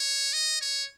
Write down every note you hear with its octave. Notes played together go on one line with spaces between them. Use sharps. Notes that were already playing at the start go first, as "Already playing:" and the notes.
Already playing: C#5
D#5
C#5